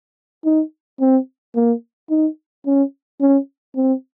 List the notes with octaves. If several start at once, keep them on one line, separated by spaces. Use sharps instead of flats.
D#4
C4
A#3
D#4
C#4
C#4
C4